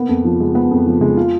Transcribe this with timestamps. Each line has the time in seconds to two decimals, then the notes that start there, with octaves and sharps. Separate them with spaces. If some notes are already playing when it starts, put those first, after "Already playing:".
Already playing: A#3 B3
0.09 F2
0.24 F3
0.40 G#3
0.55 B3
0.71 F2
0.86 F3
1.01 G#3
1.17 F4